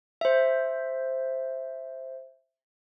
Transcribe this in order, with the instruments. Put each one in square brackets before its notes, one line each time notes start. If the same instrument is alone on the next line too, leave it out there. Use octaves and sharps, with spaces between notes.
[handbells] C5 E5